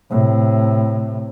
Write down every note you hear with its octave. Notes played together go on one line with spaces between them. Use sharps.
A2 C3